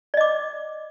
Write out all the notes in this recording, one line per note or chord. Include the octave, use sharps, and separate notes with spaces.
D5 D#5 D6